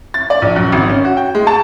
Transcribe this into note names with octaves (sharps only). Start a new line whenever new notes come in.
A6
D5
A#1
F#2
G#1
C#4
F#4
G5
G#3
A5